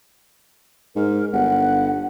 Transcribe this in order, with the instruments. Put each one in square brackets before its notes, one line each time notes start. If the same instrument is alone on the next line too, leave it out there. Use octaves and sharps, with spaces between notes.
[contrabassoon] G#2 [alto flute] A#4
[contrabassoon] G1 [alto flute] F#5